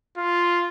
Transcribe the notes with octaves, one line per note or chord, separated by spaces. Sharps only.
F4